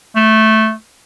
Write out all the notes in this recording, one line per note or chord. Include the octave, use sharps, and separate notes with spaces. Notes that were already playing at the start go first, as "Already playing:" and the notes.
A3